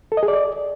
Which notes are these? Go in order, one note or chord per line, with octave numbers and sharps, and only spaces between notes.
A4
D#5
G#4
D5